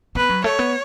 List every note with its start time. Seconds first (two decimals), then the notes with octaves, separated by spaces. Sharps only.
0.15 B3 B4
0.30 F#3
0.44 A3 C#5
0.59 B3